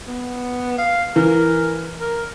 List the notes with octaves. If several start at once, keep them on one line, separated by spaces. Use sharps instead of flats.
B3
F5
E3 A#4
A#4